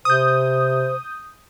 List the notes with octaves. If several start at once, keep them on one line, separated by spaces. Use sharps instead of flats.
C3 C5 D#6 G6